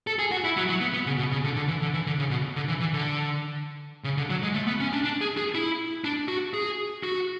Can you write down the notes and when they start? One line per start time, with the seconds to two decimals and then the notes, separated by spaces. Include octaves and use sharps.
0.07 A4
0.19 G#4
0.31 F#4
0.44 E4
0.57 F#3
0.69 F#3
0.81 B3
0.94 B3
1.06 C#3
1.18 B2
1.32 C#3
1.44 D3
1.56 D3
1.68 E3
1.81 D3
1.93 E3
2.06 D3
2.19 C#3
2.30 B2
2.56 D3
2.68 E3
2.80 E3
2.93 D3
4.04 C#3
4.17 D3
4.30 F#3
4.43 G#3
4.54 A3
4.67 B3
4.80 C#4
4.93 D4
5.04 D4
5.21 G#4
5.37 G#4
5.55 E4
6.04 D4
6.28 F#4
6.54 G#4
7.03 F#4